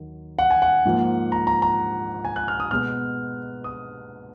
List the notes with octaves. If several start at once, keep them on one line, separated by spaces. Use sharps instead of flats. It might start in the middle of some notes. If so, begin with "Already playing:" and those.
Already playing: D#2 D#3 F#3
F#5
G#5
F#5
G#2 F3 A#3
A#5
A#5
A#5
G#5
F#6
F6
D#6
B2 G#3 B3 F6
D#6